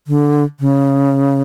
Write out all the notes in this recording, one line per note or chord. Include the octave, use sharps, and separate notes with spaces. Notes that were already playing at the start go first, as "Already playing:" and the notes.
D3
C#3